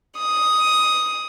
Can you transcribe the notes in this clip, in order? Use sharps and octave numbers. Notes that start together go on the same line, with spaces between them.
D#6